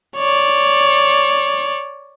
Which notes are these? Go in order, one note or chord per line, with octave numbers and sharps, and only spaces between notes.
C#5 D5